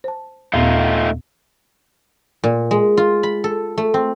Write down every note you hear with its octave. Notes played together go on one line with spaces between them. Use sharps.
C5 A5
D#2 A#2 A3 B3 D#4 F4
A#2
G#3
F4
B5
A4
A3
C4